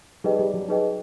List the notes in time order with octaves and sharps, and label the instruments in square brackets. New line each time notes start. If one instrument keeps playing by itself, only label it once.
[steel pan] G3 [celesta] D#4 G#4 B4 D#5 G5
[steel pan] G3
F#3
[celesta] D#4 G#4 B4 D#5 G5